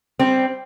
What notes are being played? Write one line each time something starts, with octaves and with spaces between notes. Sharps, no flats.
G3 C4